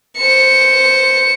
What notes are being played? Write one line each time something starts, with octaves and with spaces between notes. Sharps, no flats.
C5 C#7